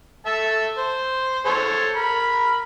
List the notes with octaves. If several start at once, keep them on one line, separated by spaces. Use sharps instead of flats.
A4 E5 A5
C5
A4 C5 C#5
A#4 B5